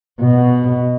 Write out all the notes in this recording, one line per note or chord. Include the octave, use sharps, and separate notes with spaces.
B2